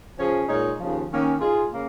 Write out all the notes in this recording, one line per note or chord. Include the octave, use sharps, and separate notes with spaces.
C#3 F3 C#4 G#4 C#5
A#2 G#3 D#4 A#4 C#5
D#2 C#3 F3
D#3 A#3 C#4
G#2 G#3 F4 G#4
C#3 A#3